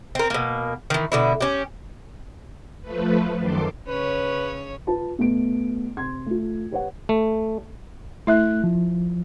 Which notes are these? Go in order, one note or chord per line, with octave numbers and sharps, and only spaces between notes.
C4 A#4
B2 A#3
D#3 E3
B2 D3 E4
C#4 G4
F3 A3 B4
F#2 D#3 A4 C6 D6
C#3 C#4 B4 C#5
F4 B4 A5
B2 A3 B3 D7
C3 C6 G#6
A3 F4
G4 B4 C#5 F#5
A3
A3 E4 E5 F#6
F3